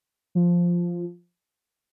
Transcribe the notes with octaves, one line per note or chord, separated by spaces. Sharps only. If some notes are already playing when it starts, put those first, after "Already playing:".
F3